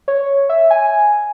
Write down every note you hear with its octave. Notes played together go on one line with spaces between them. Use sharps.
C#5
E5
G#5